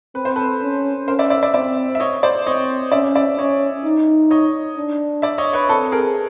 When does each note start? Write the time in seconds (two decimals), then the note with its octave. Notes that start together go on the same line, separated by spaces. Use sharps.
0.15 C4 B4
0.25 C5
0.36 A4 B4
0.62 C#4
1.07 C#4 A#4 C5
1.19 D5 E5
1.30 D5 E5
1.43 D5 E5
1.54 C4 D5 E5
1.95 E5
2.00 C#5 D#5
2.23 C5 D5
2.47 C4 C#5 D#5
2.92 C#4 D5 E5
3.15 D5 E5
3.38 C#4 C#5 D#5
3.84 D#4
4.30 C#5 D#5
4.77 D4
5.22 D5 E5
5.38 C#5 D#5
5.53 B4 C#5
5.69 C4 A4 B4
5.92 G#4 A#4